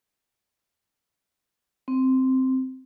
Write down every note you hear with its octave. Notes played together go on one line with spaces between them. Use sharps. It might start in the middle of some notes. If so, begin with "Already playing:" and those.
C4